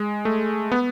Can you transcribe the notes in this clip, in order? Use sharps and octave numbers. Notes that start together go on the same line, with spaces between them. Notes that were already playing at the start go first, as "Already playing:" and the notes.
Already playing: G#3
A3
B3